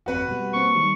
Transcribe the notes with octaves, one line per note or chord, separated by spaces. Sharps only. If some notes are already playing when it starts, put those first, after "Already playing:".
G1 F2 C4 F#4 B4 F#5
B2 G3
A#3 C4 C#6
D#3 G3